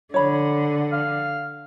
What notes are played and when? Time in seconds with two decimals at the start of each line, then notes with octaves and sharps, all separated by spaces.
0.14 D3 C#5 B5
0.92 F5